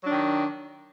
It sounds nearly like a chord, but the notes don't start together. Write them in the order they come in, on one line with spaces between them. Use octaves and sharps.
F#3 D4 D#3